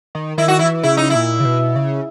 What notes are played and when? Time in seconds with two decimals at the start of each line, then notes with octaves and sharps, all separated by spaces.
0.15 D#3
0.38 D#3 E4
0.48 F#4
0.59 E3 E4
0.83 C#3 E4
0.97 D#4
1.10 A#2 E4
1.40 C#3
1.45 B2
1.76 C#3